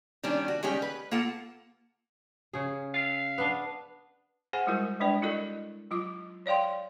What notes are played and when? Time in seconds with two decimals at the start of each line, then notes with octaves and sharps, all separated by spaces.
0.23 D#3 G3 C#4 D4
0.48 F#4
0.63 D#3 G3 G#3 C#4 G4
0.82 B4
1.11 A#3 F4 A4 F#5
2.53 C#3 G#4
2.94 F5
3.38 B3 D4
4.53 G#4 C5 F#5 G#5
4.67 G3 G#3 E4 F#4 A#4
5.00 G#3 D4 B4 D5 G5
5.22 E4 F#4 A4 A#4 D#5
5.91 F#3 F4 D6
6.46 C#5 D5 F5 G5 C6